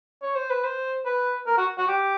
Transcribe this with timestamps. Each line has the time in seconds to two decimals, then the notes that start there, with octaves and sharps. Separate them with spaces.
0.22 C#5
0.35 C5
0.50 B4
0.64 C5
1.05 B4
1.46 A#4
1.57 F#4
1.78 F#4
1.88 G4